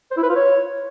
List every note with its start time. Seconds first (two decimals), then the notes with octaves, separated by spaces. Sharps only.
0.11 C5
0.17 E4
0.23 B4
0.29 F4
0.36 C#5